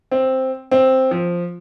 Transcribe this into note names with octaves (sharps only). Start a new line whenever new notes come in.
C4
C4
F3